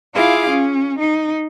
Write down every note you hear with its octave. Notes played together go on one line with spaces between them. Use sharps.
E4 F4 G#4 F5 D6
C#4
D#4